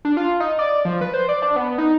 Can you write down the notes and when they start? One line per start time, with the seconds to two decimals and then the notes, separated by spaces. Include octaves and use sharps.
0.05 D4
0.17 F4
0.40 D#4
0.59 D5
0.85 F3
1.01 B4
1.14 C5
1.29 D5
1.42 D4
1.56 B3
1.78 D#4